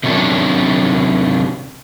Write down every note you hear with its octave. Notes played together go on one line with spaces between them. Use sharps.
C3 D#3 F#3 C#4 D4